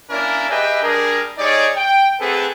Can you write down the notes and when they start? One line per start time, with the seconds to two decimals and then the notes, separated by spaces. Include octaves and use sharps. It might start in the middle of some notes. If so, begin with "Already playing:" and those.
0.10 A#3 C#4 D4 E4 A#4 D5
0.49 G4 G#4 B4 D#5 E5 G5
0.82 G3 D4 G#4 A#4
1.38 G3 D#4 G#4 C#5 D5
1.76 G5
2.20 A3 C4 F#4 G#4 A4 B4